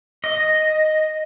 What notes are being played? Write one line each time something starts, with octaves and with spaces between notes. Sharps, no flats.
D#5